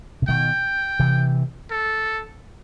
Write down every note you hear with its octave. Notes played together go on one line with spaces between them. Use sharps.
C3
B2 D#3 G5
C3 E3
A4